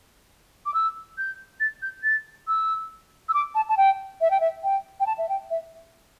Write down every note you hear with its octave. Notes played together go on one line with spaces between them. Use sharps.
D6
E6
G6
A6
G6
A6
E6
E6
D6
A5
A5
G5
E5
G5
E5
G5
G5
A5
E5
G5
E5